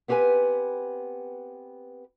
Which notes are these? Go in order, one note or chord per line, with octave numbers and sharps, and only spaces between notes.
B3 C4 G4 B4 G#5